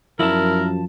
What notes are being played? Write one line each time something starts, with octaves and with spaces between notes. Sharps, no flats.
F#2 F3 E4 A#4 A5